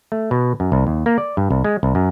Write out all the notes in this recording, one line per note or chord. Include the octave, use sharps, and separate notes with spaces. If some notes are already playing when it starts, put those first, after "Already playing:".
A3
B2
F#2
C2
D#2
A#3
D5
G2
C2
G#3
C2
F#2